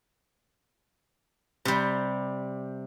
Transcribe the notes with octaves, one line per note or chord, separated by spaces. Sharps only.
C3 G3